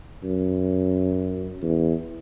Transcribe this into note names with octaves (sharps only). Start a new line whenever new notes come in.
F#2
E2